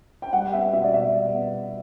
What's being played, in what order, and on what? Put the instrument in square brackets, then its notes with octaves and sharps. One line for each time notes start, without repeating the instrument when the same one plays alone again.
[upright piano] G5
G3 F#5
B3 E5
B2 E5
D5
B2 E5
G3
B3